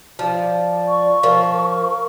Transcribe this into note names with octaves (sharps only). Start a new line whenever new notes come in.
F3 D5
C#6
F3 A#4